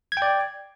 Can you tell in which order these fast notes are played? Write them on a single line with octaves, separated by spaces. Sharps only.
G#6 G5 D5